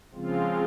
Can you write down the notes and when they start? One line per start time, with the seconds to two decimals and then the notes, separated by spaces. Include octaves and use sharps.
0.14 C#3 F3 G#3 C4 F4